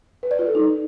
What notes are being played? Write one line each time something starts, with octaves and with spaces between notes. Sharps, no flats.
B4
D5
F4
A4
D#4